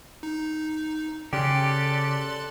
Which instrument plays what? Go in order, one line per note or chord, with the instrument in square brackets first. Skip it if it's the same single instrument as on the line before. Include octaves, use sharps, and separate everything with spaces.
[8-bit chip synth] D#4
[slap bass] C#3 [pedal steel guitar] G4 [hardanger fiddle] A4 [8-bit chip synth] D5 C6 F#6